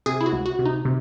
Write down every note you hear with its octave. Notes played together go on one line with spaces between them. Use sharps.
C3 G#4
E4
F#4
C#2
F#4
C3
D#4
C3